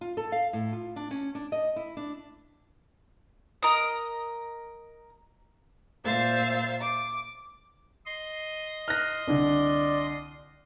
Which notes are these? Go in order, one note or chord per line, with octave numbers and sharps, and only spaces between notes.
F4
A4
F5
A2
F4
D4
C#4
D4
D#5
E4
D4
A#4 D#5
A#2 C5 E5 F5 A6
D6
D#5 C6
F6 F#6 A#6
C2 D3 D5